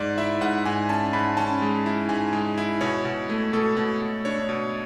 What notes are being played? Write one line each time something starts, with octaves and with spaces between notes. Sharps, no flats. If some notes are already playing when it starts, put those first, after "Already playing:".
Already playing: G#2 D5
E4 E5
G#2 F#5
G#2 G#5
C#4 A5
G#2 B5
C#4 A5
G#3
E4
G#2 G#5
G#3
E4
B2 C#5
B2
A3
B2 A4
B2
B2
D4 C#5
B2